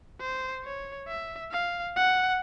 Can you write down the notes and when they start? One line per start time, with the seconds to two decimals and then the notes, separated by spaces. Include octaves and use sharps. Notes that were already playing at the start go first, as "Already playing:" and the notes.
0.20 C5
0.64 C#5
1.08 E5
1.51 F5
1.96 F#5